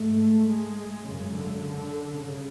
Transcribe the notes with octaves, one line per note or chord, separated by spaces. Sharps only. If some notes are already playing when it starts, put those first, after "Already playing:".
Already playing: G#2 A3
G#3
F#2 C#3
D3
D3
G2 C#3